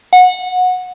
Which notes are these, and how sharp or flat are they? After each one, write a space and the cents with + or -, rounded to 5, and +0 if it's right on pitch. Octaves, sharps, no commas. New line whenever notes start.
F#5 -20